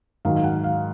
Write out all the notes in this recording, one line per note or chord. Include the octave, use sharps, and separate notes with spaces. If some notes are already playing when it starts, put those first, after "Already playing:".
G#2 D#3 F#3 F5
F5
F#5
F5